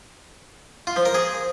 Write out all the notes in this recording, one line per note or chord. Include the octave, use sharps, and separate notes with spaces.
F4
F3
A#4
G#4